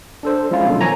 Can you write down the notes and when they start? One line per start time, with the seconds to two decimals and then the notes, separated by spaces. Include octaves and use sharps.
0.23 D4 A4 C5
0.51 F3 G#3 C#4 E4 F4
0.67 B2 D3 F#3 A4
0.81 D#3 F3 C#5 G#5 A#5